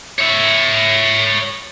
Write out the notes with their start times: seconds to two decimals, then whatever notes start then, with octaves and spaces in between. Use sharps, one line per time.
0.19 C#5 E5